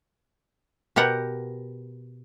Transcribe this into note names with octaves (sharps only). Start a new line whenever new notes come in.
B2 G4 A#4 F#5